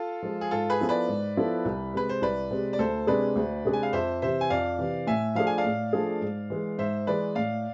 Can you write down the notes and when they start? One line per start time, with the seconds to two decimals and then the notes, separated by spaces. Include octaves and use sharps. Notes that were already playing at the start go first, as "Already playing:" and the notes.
Already playing: F4 A4
0.23 F3 G#3
0.41 G#4
0.51 G#2 F4 A4
0.70 G#4 B4
0.80 F3 B3 E4 A4
0.89 B4 D5
1.08 G#2
1.37 F3 B3 E4 A4
1.65 C2
1.93 C3 G#3 B4
2.09 C5
2.22 C2 B4 D5
2.51 C3 G#3
2.73 D5
2.79 D2 A4 C5
3.07 C3 G#3 D4 G#4 B4 D5
3.36 D2
3.65 C3 G#3 D4 G#4
3.73 G#5
3.83 F5
3.93 F2 C5 E5
4.22 C3 E3 C5 E5
4.41 G#5
4.50 F2 D5 F5
4.79 C3 E3
5.07 A2 E5 G#5
5.35 F3 A3 D4 G#4 F5
5.47 G#5
5.58 D5 F5
5.64 A2
5.93 F3 A3 D4 G#4
6.21 G#2
6.50 E3 G#3
6.78 G#2 C5 E5
7.07 E3 G#3 B4 D5
7.35 A2 D5 F5